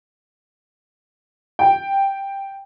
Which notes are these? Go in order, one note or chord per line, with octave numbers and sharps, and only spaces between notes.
G5